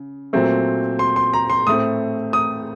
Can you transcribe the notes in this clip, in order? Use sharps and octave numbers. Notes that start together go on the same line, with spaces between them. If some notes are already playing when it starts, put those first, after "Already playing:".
Already playing: C#3
A#2 F#3 A3 C4
C6
C6
A#5
C6
A2 A3 C4 D#6
D#6